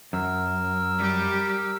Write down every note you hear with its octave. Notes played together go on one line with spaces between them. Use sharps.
F#2 A#4 E6
G3 G4